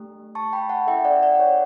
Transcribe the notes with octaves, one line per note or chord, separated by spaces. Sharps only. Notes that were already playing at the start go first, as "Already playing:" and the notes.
Already playing: A3 D4 G4
A5 C#6
G5 B5
F#5 A5
C#4 E4 A4 E5 G5
D5 F#5
D5 F#5
C#5